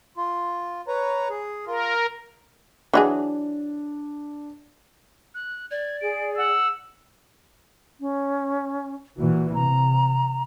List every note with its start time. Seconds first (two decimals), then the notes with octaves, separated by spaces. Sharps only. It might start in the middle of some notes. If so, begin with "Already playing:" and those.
0.17 F4
0.88 B4 C#5 A#5
1.30 G#4
1.67 F4 A#4
2.93 E3 F#3 D4 G#4
5.35 F#6
5.71 D5 G#6
6.01 G#4 D7
6.37 F#5 E6
8.00 C#4
9.17 A#2 E3 F#4
9.54 C3 A#5